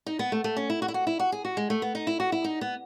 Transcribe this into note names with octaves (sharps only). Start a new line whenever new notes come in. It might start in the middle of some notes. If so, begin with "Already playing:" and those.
D#4
B3
A3
A3
C#4
E4
F#4
E4
F#4
E4
F#4
G#4
F#4
G#3
A3
B3
D#4
E4
F#4
E4
D#4
B3